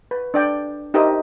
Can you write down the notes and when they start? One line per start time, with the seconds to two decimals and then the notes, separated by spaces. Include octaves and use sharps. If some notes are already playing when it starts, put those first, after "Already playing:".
0.11 B4
0.34 D4 D5 G5
0.94 D#4 G4 A#4 C5 D#5 E5